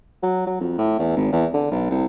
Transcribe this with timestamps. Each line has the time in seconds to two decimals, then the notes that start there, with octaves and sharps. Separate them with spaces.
0.23 F#3
0.47 F#3
0.60 F2
0.78 A2
0.99 E2
1.16 G#1
1.32 E2
1.54 D3
1.71 B1
1.90 C2